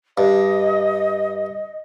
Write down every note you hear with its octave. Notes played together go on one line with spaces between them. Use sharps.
G2 D#5